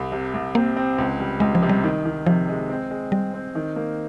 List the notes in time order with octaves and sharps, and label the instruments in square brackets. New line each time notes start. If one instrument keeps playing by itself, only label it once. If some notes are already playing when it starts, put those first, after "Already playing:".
Already playing: [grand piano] C2
C3
C2
[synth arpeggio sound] A#3 [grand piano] C4
[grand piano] C4
C#2
G3
[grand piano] C#2 [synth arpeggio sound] G#3
[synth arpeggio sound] F3
[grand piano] C3
[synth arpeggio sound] G3
[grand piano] D#3
D#3
[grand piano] C3 [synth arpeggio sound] F3
[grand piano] G#3
C4
G#3
[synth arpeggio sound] G3 [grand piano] C4
[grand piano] C4
D#3
A#3